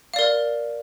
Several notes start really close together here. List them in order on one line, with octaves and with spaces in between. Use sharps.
F5 D5 A#4